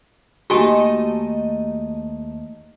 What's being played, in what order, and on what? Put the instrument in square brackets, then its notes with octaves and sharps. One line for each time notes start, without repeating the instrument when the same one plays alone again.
[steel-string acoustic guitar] D#2 A3 A5 [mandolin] D#4 D#5 [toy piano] F#4 G4 G#5